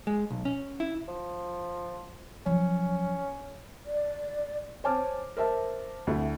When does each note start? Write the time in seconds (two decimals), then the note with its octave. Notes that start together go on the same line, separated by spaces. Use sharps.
0.07 G#3
0.30 B1
0.45 C#4
0.80 E4
1.08 F3
2.46 F3 F#3 C#4
3.86 D5
4.84 C5 C#5 G#5 A5 D6 F6
5.37 A#4 C5 E5 A5
6.07 D2 D3 E4 A4 E5